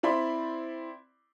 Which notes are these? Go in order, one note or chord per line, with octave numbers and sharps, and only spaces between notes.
C4 E4 D5 B5 C6